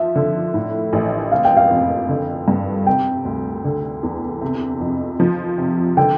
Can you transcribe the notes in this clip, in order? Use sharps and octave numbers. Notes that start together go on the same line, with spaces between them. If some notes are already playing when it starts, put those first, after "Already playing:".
Already playing: F3 E5
D3
A2
A1
C3 F5
G5
F5
F2
D3
G2
C3 G5
D2
D3
E2
C3
F2
F3
C3
D3 G5